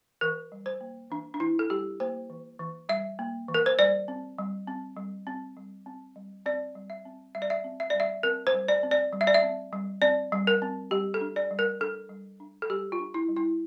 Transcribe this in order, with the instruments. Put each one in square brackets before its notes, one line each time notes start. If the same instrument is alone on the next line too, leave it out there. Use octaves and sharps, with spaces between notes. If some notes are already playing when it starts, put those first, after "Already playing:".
[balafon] E3 A#4
G3
C5
A#3
E3 D4
D4
E3 E4
A4
G3 G4
A#3 C5
E3
E3
G3 E5
A#3
E3
A#4
C5
G3 D5
C4
G3
C4
G3
C4
G3
C4
G3
C4 D5
G3
E5
C4
G3 E5
D5
E5
C4
E5
G3 D5
E5
C4 A#4
C5
G3
D5
C4
D5
G3
E5
D5
E5
C4
G3
C4 D5
G3
A#4
C4
G3 G4
A4
D4
D5
G3
A#4
D4 A4
G3
D4
A4
G3 G4
F4
D4
E4
G3
E4